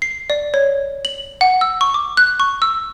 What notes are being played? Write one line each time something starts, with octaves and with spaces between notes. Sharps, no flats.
C7
D5
C#5
F#7
F#5
E6
C#6
D6
F#6
C#6
E6